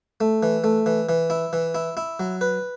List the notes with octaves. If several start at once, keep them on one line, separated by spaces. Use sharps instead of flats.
A3
E3
A3
E3
E3
E4
E3
E4
E4
F#3
B4